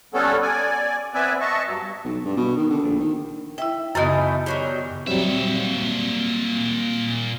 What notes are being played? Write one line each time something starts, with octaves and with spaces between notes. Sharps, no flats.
G3 B3 C#4 A4
D5 G#5
B3 C4 B4 D5 E5 G#5
D#5 E5 A5 C#6
G2 F#3
B1
G2
B2
D#3
D3
A#1
D#3
E4 E5 G5
F#2 C#3 E3 A3 B3 D#4
D#3 F#3 G3
A#2 F#3 G3 C4 E5